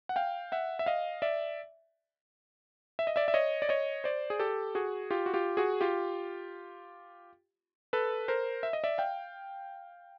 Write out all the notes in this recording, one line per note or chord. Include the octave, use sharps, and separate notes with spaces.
F#5
F5 G5
E5 F#5
E5
D#5 F5
D5 E5
E5
D#5
D5 E5
E5
C#5 D#5
D5
C#5 D#5
C5 D5
G#4
G4 A4
F#4 G#4
F4 G4
F#4
F4 G4
F#4 G#4
F4 G4
A4 B4
A#4 C5
E5
D#5
D5 E5
F5 G5